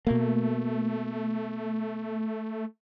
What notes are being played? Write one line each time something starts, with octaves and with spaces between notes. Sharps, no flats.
B2 A3 A#3